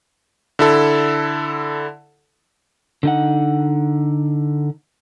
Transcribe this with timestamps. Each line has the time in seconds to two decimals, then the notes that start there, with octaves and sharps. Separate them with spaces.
0.59 D3 E4 A4
3.03 D3 D#4 F#5